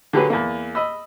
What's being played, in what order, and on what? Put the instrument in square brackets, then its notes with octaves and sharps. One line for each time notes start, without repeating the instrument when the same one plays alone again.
[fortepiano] D3 F#3 G4 G#4 B4
E2 A#3
D#5 B5 E6